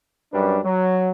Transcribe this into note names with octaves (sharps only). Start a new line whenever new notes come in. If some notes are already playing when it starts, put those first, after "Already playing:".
F#2 G3 D4 B4
F#3